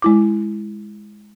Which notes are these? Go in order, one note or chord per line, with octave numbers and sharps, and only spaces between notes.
G#3 E4 D6